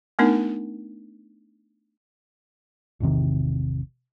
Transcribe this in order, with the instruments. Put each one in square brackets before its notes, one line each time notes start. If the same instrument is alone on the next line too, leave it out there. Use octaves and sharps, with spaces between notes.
[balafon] A3 B3 D4 D#4 A#4
[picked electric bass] G#1 E2 C3 D#3